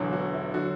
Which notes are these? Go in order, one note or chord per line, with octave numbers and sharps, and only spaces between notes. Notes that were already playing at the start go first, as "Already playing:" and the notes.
Already playing: E1 E2 D3 F#3
F#4
E4
D3 F#3 F#4